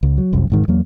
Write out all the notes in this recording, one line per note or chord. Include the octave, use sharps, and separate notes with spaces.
C#2
F#3
F1 C2 F#2
E1 G#2 D#3
E2 F#3 A#3